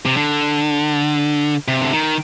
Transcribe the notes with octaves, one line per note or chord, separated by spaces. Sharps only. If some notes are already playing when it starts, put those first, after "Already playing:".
C3
D3
C3
D3
D#3